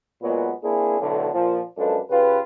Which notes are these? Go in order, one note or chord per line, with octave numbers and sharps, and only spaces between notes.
A#2 F#3 G#3 B3
A#3 C4 D4 E4 G#4
B1 A2 D3
A#2 F3
F#2 F3 G#3 D4 A4 B4
C#3 F4 G4 B4